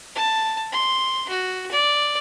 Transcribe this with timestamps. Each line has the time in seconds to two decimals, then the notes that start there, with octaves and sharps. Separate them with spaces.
0.15 A5
0.72 C6
1.29 F#4
1.71 D5